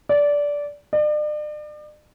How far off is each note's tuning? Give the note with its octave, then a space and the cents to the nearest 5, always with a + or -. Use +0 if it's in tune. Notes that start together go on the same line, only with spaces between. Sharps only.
D5 -15
D5 +40